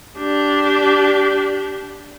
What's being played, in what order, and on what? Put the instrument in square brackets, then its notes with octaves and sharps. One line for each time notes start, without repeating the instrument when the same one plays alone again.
[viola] D4 G4